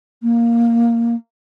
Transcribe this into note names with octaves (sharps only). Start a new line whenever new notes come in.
A#3